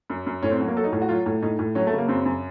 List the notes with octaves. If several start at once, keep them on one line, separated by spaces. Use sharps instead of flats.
F#2
F#2
A2 C#4
C4
F#3 C#4
A#3
F#3 A4
D#4
A2
F#4
F#3 F4
A2
A2 D#4
A2
F#3 C#4
A3
C#3
A#3
F#2 C4
F#2